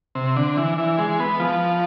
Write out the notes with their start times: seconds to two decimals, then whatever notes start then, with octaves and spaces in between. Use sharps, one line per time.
0.15 C3
0.36 D3
0.57 E3
0.78 E3
0.98 G#3
1.20 B3
1.40 F3